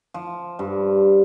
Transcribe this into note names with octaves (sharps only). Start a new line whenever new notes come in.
F3
G2